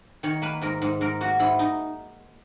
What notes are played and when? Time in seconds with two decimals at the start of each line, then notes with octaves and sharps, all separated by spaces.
0.23 D#3 C#5
0.42 A#3 B4
0.62 G#2 A#4
0.82 G#2
1.01 G#2 A#4
1.21 A#3 F#4
1.39 G#2 E4
1.59 D#4